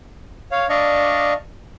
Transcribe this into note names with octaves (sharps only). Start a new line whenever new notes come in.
C#5 F5
D4 D5 D#5 F5 C#6